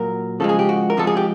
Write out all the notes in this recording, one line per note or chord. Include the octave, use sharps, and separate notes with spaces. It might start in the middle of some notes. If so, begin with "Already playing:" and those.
Already playing: A#2 F#3 A#4
C#3 F3 G#3 A4
G#4
G4
F#4
A#4
C3 F3 G#3 A4
G#4
G4